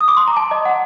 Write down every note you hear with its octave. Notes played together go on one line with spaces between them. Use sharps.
D#6
D6
C6
A#5
A5
D#5
F#5